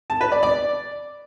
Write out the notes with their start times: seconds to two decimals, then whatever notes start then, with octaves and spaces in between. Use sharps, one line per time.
0.10 A5
0.21 B4
0.32 D5
0.43 D5